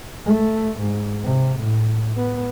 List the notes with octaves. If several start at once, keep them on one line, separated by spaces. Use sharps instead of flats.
A3
G#2
C3
A2
B3